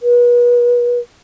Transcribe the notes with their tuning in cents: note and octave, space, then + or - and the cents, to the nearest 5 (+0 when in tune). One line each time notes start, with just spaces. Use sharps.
B4 -35